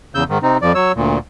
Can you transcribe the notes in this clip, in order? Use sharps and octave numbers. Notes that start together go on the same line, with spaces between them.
E2 C#3 E6 G6
G#2 D#3
C3 C4 D#4
F2 F3 D5
F#3 C#5 E6
D2 A#2